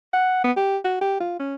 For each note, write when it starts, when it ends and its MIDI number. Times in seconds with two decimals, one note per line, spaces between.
0.14 0.43 78
0.44 0.52 59
0.57 0.78 67
0.85 0.99 66
1.01 1.18 67
1.20 1.35 65
1.40 1.55 61